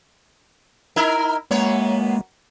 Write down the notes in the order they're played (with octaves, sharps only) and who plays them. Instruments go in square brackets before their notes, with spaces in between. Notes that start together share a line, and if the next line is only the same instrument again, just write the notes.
[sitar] D#4 E4 A#4
[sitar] F#2 B3 C#5 [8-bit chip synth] G#3 A#3